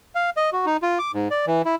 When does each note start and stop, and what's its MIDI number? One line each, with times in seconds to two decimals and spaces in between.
0.15 0.30 77
0.37 0.50 75
0.53 0.66 66
0.66 0.77 63
0.83 0.99 65
0.99 1.11 86
1.14 1.28 44
1.31 1.45 74
1.47 1.62 52
1.65 1.75 64